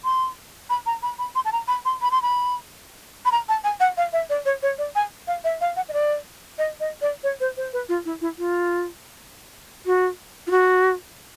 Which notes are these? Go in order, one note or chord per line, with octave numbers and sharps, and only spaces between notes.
C6
B5
A#5
B5
B5
C6
A5
A#5
B5
C6
B5
C6
B5
B5
A#5
A5
G#5
F#5
F5
E5
D5
C#5
C#5
D5
G#5
F5
E5
F5
F#5
D#5
D5
D#5
D#5
D5
C#5
C5
C5
B4
F4
E4
E4
F4
F#4
F4
F#4